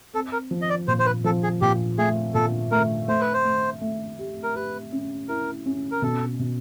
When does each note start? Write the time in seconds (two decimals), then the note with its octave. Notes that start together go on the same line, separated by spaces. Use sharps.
0.14 C4 A4
0.32 A#4
0.51 F3
0.62 D#5
0.70 D5
0.88 A#2 C5
0.99 C5
1.06 B4
1.24 F3 A4
1.43 G#4
1.61 A#2 G4
1.98 A3 G#4
2.35 A#2 A4
2.72 A3 A#4
3.08 A3 C5
3.21 B4
3.33 C5
3.45 A3
3.81 A3
4.19 G4
4.44 A#4
4.55 G4 B4
4.92 C#4
5.29 E4 A#4
5.66 C#4
5.91 A#4
6.02 B2 A4
6.39 B2